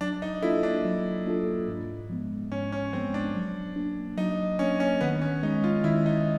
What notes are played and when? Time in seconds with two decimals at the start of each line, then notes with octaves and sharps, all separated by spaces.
0.01 F#3 D4
0.22 D#4
0.42 A#3 D4 E4 F4 A4
0.63 D4
0.84 F#3
1.25 A#3 D4 F4 A4
1.68 G#2
2.09 F3 G#3 B3
2.51 G#2 C#4
2.72 C#4
2.93 F3 G#3 B3 C4
3.14 D4
3.34 F#3
3.76 A#3 D4
4.17 F#3 D#4
4.59 A#3 C#4 D4
4.80 C#4
5.01 D#3 B3
5.21 C#4
5.43 G#3 C#4 D#4
5.64 F4
5.84 D#3 E4
6.06 D#4